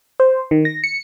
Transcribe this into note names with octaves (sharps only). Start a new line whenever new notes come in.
C5
D#3
A#6
C#7